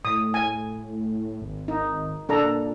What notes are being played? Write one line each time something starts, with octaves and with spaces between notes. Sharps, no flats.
A2 D#6
G#5
G#1
D#4
A#2 D4 A4 A#5